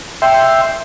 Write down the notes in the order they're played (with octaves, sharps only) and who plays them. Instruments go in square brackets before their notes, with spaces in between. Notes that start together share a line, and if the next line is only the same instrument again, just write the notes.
[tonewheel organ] E5 G5 C6